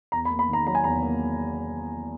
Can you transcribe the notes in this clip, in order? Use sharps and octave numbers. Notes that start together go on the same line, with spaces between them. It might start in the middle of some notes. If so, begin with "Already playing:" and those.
E2 A#5
B5
A#3
B5
D#3
A#5
F#3 A#5
G#5
E2 A#5
A#3